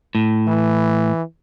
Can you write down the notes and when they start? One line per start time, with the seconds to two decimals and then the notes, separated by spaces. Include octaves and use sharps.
0.15 A2
0.47 E3